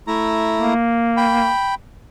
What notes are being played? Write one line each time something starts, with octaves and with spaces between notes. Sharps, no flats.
A3 E4 A#5
A#3
G5 B5